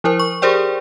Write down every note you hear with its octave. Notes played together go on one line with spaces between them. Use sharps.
F3 E4 A#4 C5
C#6
G4 G#4 A#4 C5 D5 G5